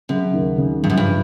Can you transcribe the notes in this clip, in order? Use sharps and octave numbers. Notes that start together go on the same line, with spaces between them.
F#2 C#3
D#2
C#3
G2 F3
F#2
G2